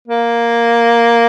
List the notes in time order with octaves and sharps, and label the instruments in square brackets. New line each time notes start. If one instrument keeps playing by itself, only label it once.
[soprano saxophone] A#3